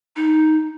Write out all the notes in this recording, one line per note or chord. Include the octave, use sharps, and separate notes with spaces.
D#4